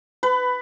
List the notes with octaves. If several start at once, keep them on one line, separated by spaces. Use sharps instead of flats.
B4